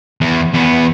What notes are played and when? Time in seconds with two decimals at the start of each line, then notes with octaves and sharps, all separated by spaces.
0.21 E2
0.53 E2 B3